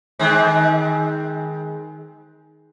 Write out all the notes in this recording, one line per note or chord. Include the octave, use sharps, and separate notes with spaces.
D#3 G#3 C4